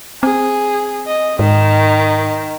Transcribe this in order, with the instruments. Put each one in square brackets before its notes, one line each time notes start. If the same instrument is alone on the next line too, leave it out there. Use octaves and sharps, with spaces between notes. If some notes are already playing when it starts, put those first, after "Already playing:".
[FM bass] C4 [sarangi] G#4
[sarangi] D#5
[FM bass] G#2 [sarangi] D#3